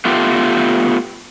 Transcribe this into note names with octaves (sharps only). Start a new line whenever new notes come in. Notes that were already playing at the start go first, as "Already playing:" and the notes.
A3 B3 F4 G4